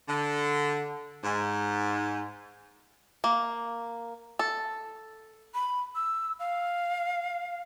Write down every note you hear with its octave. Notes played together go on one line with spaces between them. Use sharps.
D3
G#2
A#3
A4
B5
E6
F5